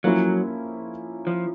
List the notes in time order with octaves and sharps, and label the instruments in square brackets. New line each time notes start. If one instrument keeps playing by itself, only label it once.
[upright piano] F3 A#3 C#4 E4 [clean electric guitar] F#3
[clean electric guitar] F3